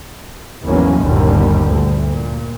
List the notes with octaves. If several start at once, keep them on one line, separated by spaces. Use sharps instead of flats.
G#1 E2 E3 F#3 A#3 C#4
G1 D#2 A#2 D3 G3
D2
A#2